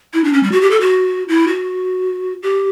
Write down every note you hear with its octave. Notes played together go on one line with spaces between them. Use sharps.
E4
D4
C#4
G3
F#4
G4
A4
F#4
E4
F#4
G4